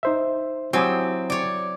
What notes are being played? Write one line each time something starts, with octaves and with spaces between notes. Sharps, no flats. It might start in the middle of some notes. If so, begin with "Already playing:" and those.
D#4 C5 E5
F#3 C4 E4 G4 G5 G#5 D#6
C#5 D5